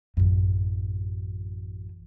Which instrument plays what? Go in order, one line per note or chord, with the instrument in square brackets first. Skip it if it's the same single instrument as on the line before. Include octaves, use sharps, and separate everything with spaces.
[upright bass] A1 F#2